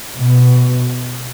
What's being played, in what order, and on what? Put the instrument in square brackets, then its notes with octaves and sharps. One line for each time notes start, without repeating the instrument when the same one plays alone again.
[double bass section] B2